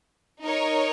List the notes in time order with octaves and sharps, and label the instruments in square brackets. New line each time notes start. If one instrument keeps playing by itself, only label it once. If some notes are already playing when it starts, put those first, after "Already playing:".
[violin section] D#4 A#4 C#5